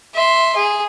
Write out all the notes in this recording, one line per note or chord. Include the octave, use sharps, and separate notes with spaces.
E5 C6
G#4